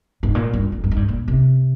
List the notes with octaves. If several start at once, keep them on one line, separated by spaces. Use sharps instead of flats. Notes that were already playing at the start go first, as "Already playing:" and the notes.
G#2
A#2
G2
F2
G2
G#2
G2
A#2
C3